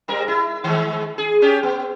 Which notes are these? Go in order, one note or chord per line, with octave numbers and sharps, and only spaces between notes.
G#2 G3 A#4
E4
D#3 G#3
G#4
C#4 G4 G#4
B3